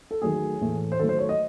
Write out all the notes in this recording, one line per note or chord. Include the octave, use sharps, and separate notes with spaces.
A4
D#3 F#3 A3 G#4
A2 E3 A3
C5
D#3 F#3 A3 A4
C5
C#5
D#5